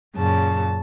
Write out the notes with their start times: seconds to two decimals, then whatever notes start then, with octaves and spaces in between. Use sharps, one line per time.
0.15 F#2 A#2 C#3 A5